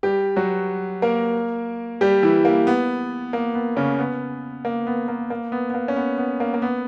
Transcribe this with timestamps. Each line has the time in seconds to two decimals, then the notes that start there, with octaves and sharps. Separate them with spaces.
0.03 G3 G4
0.36 F#3 F#4
1.02 A#3 A#4
2.01 G3 G4
2.23 E3 E4
2.45 A#3
2.67 B3
3.33 A#3
3.55 B3
3.76 C#3 C#4
3.99 B3
4.65 A#3
4.87 B3
5.08 A#3
5.30 A#3
5.52 B3
5.70 B3
5.74 A#3
5.88 C#4
5.96 B3
6.18 B3
6.40 A#3
6.54 A#3
6.62 B3